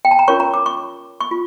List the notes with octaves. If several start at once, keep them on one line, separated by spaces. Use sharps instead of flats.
G5
A5
A#5
C#4 F4 A#4 C#5 C#6
A#5
D6
C#6
C#6
F4